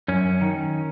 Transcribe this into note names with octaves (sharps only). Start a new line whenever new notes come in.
F#2 C#4
D#3